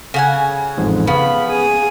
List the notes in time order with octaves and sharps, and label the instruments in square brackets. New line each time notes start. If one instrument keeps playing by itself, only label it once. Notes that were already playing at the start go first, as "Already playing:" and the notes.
[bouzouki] C#3 F#5 G#5
[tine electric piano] A1 F2 G#2
[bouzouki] C#3 [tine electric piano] B3 [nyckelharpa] B5
[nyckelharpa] G#4 G#5